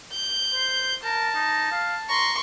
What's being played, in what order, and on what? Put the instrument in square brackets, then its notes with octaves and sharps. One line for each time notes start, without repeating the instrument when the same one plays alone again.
[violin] G6
[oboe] C5
[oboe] A#4 [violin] A5
[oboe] D#4
F5
[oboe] A#5 [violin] C6 C#6